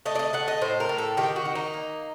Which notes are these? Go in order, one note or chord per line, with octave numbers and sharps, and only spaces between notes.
A3 D#5
D5
D#5
A3 F#5
D#5
A2 C5
A#4
A2
A4
D#3 G4
F#4
D#3
D#4
A#3